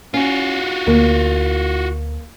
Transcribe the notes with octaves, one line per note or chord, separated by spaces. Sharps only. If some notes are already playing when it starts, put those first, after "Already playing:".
C#4 F4 F#4
D2 A#3